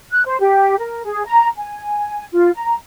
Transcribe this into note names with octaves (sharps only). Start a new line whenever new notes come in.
F#6
C5
G4
A#4
G#4
A#5
G#5
F4
A#5